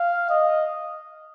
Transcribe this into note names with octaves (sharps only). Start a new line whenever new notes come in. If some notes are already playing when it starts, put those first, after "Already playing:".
Already playing: F5
D#5